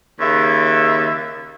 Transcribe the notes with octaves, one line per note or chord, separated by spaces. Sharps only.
D#2 C#3 E5